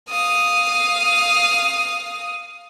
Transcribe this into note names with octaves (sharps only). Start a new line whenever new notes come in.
F5 D#6